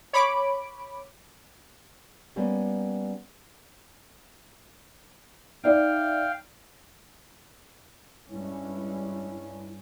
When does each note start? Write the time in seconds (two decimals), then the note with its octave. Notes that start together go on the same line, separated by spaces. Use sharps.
0.13 C#5 B5 D6 D7
2.36 G3 A#3 B3 C#4 G4
5.64 D#4 D5 E5 F5 G5
8.30 G2 G#3 C#4 E4